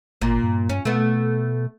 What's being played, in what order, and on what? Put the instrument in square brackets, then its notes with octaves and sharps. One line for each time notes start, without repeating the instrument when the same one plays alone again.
[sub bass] G#1 [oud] A#2
[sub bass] G2
[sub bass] G2 [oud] C#4
[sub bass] B2 [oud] A3 B3